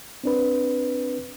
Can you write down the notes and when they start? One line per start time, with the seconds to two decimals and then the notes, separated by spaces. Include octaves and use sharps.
0.24 C4 D4 B4